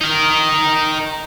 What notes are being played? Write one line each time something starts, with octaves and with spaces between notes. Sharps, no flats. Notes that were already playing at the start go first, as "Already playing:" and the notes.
D#4 A#4